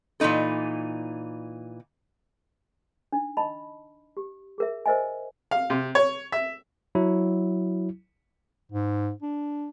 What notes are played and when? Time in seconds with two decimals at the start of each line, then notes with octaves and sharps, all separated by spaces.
0.20 A#2 E3 C4 D#4 A4
3.12 D4 D#4
3.37 D#5 A5 B5
4.17 G4
4.58 G#4 A#4 E5
4.86 A#4 C5 D#5 E5 G#5
5.51 F5
5.70 C3
5.95 C#5
6.32 E5
6.95 F#3 E4
8.72 G#2
9.22 D4